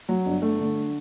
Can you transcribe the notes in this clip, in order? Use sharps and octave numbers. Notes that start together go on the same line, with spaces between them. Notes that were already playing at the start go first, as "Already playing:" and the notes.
F#3
G1
A3
D3